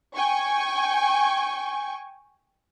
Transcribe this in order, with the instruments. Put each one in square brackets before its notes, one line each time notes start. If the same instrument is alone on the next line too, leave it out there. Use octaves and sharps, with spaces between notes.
[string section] G5 G#5 C#6